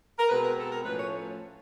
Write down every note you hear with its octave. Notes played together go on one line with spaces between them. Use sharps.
A#4
B2 G#3 C4 B4
A#4
A4
A#4
A2 F3 A3 C#4 B4
C#5